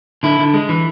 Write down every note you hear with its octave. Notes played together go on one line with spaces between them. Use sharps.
D3 E4
D3
G#3
E3